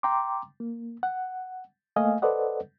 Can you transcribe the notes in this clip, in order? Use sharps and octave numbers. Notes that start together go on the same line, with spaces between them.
G5 A#5 C6 D6
A#3
F#5
A3 A#3 D#5 F5 G#5
A4 B4 C5 D5 D#5 F#5